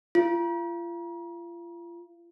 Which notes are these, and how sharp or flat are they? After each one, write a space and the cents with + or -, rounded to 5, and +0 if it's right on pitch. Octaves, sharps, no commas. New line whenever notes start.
F4 -35